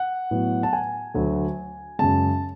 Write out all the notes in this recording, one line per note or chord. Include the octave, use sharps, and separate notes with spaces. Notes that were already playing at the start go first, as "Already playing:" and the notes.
Already playing: F#5
A2 F#3 B3
A5
G#5
D2 D3 F#3 A3
F#2 C#3 G#3 A5